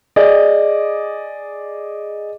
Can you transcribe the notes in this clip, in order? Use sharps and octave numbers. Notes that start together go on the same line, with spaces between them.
G#4 D5 D#5